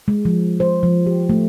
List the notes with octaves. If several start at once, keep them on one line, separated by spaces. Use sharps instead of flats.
G#3
F3
C5
F3
G4
A3